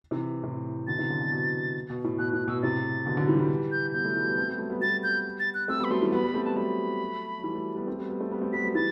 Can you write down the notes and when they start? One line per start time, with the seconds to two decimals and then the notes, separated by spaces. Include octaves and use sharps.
0.11 C3 E3
0.43 A2 C3
0.87 B2 D3 A6
0.99 C3 E3
1.10 D3 F#3
1.21 B2 D3
1.32 B2
1.90 B2
2.04 A2
2.19 B2 F#6
2.33 A2 F#6
2.48 B2 E6
2.63 A2 C3 A6
3.06 B2 D3
3.17 D3 F#3
3.28 E3 G3
3.39 E3 G3
3.72 G6
3.94 G3 B3 G6
4.05 F#3 A3
4.16 E3 G3
4.27 G3 B3
4.37 A3 C4
4.49 G3 B3
4.59 F#3 A3
4.70 G3 B3
4.81 G3 B3 A6
5.03 G6
5.40 A6
5.54 F#6
5.68 A3 C4 E6
5.80 G3 B3 B5
5.90 F#3 A3 C6
6.02 E3 G3
6.12 G3 B3 B5
6.23 G3 B3
6.34 A3 C4
6.45 G3 B3 A5
6.56 F#3 A3 B5
7.39 F#3
7.44 E3 G3
7.55 F#3 A3
7.76 G3 B3
7.87 A3 C4
7.98 G3 B3
8.09 G3 B3
8.20 A3 C4
8.31 G3 B3
8.42 A3 C4
8.53 G3 B3 B6
8.63 F#3 A3
8.75 E3 G3 A6